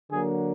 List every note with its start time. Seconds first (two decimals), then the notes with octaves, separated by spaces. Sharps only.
0.11 D3 F#3 A#3 G#4